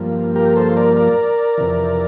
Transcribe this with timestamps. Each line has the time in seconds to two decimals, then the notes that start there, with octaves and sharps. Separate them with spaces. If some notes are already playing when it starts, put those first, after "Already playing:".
Already playing: G2 F3 A#3
0.36 G4 A#4
0.56 A4 C5
0.77 A#4 D5
0.96 A#4 D5
1.58 F2 C3 E3